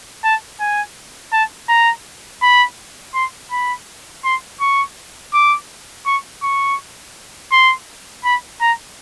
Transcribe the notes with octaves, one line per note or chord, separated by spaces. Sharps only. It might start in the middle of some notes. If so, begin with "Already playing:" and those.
A5
G#5
A5
A#5
B5
C6
B5
C6
C#6
D6
C#6
C#6
C6
B5
A#5